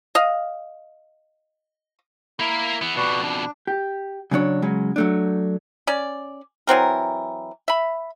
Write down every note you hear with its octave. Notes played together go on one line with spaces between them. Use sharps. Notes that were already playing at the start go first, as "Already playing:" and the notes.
D#5 F5
A#3 E4 A#4 B5
E3 B3
F2 B2 F#4 B4 D5
D4
G4
C#3 F#3 D4 C#5
C#3 F#3 G#3
F#3 A3 D4
C#4 D5
E3 F#3 C4 A#4
E5 B5